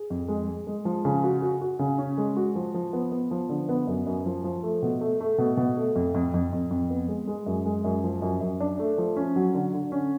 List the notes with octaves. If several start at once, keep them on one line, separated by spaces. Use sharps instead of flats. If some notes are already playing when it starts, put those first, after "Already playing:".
Already playing: G#4
F2
G#3
G#3
G#3
F3
C#3
F#4
F#4
F#4
C#3
C#4
G#3
F#4
F3
F3
B3
B3
F3
D3
B3
F#2
F#2
F3
F3
A3
B2
A3
A3
B2
B2
A3
F2
F2
F2
F2
F2
B3
G#3
G#3
F#2
G#3
F#2
F3
F#2
F#2
D4
A3
F3
C#4
F#3
D3
D3
C#4